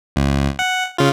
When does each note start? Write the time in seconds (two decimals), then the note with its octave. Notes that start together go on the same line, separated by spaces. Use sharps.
0.16 C#2
0.59 F#5
0.98 C#3 F4